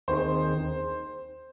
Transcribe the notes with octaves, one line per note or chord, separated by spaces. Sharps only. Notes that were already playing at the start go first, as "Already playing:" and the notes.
D#2 D#3 C4 D#4 G#4 C5